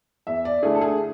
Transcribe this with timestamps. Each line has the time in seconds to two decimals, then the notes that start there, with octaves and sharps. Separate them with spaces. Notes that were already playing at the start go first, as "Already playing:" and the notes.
0.27 E2 E5
0.45 D5
0.63 D3 A3 E4 G#4
0.75 A4
0.81 G#4